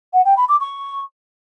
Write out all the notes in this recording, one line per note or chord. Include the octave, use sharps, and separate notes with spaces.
F#5
G5
B5
D6
C#6